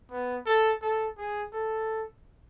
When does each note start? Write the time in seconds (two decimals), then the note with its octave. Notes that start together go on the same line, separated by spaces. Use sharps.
0.11 B3
0.46 A4
0.82 A4
1.17 G#4
1.53 A4